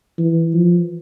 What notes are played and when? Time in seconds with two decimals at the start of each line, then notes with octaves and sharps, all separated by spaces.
0.19 E3
0.54 F3